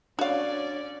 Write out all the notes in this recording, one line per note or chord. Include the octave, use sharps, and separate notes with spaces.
C#4 D4 F#4 C#5 D5 F5